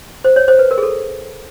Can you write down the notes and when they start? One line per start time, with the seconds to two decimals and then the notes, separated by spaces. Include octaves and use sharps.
0.24 C5
0.36 C#5
0.48 C5
0.59 B4
0.71 A#4
0.78 G#4
0.83 A4